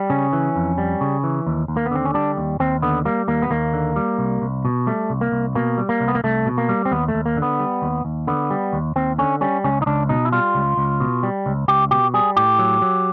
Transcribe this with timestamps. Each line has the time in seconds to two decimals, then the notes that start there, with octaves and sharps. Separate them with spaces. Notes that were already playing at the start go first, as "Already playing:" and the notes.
Already playing: G3
0.10 C#3 C#4
0.33 E3
0.56 F2
0.78 G3
1.01 C#3
1.24 E3
1.47 D#2
1.68 D#2
1.77 A#3
1.86 B3
1.91 D3 C4
2.05 C#4
2.14 G3 D4
2.37 D#2
2.60 D#2 C4
2.82 D3 B3
3.05 G3 A#3
3.28 D#2 A#3
3.42 B3
3.51 D#2 A#3
3.73 D3
3.96 G3
4.18 C2
4.42 C2
4.65 B2
4.87 G3 A3
5.10 C2
5.21 A#3
5.32 C2
5.55 B2 A#3
5.78 G3
5.89 A#3
6.00 C2
6.08 B3
6.15 A#3
6.24 C2 A3
6.46 B2
6.58 A#3
6.69 G3
6.85 C4
6.91 D#2 B3
7.08 A3
7.14 D#2
7.26 A#3
7.37 D3
7.42 B3
7.59 G3
7.82 D#2
8.05 D#2
8.27 D3 B3
8.51 G3
8.73 D#2
8.96 D#2 C4
9.18 D3 C#4
9.41 G3 C#4
9.64 C#2 C#4
9.82 D#4
9.86 C#2 D4
10.09 B2 D#4
10.25 E4
10.32 G3 F4
10.55 C#2
10.77 C#2
11.00 B2
11.23 G3
11.46 C#2
11.68 C#2 G4
11.91 B2 G4
12.14 G3 G#4
12.37 A2 G4
12.59 F#3
12.82 F#3